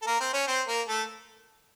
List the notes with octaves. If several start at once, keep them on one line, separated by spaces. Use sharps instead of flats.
A4
A#3 A#4
C4 C5
C#4 C#5
C4 C5
A#3 A#4
A3 A4